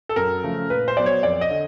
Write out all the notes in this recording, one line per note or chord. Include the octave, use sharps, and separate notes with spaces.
A4
F#2 A#4
C#3 F3 A3
A#2 B4
C5
F#3 B3 D5
C#5
F2 D5
D#5
D3